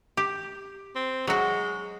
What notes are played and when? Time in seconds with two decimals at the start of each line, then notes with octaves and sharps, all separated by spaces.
0.17 G4
0.95 C4
1.27 F#3 G#3 F#4